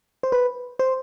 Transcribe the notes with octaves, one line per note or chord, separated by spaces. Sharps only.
C5
B4
C5